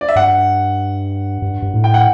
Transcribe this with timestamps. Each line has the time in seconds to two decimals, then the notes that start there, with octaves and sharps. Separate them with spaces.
0.01 D5
0.08 E5
0.16 G2 F#5
1.42 G2
1.62 G2
1.74 A2
1.84 G5
1.94 F#5